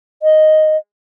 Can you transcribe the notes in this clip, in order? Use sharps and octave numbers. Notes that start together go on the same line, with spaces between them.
D#5